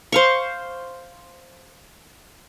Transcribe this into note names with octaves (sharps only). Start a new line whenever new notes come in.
C5 F5 C#6